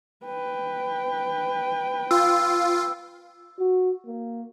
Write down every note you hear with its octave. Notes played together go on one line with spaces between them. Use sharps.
B4 G5
F4 E6
F#4
A#3